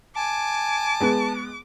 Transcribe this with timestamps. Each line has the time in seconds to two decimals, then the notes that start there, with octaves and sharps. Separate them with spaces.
0.16 G#5 A5 D6
1.00 G#3 B3